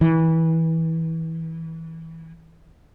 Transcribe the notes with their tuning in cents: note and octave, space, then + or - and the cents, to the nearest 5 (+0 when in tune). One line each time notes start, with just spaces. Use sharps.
E3 -20